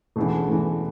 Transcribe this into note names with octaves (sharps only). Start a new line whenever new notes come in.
E1 D2 C#3 E3
E1 D2 C#3 E3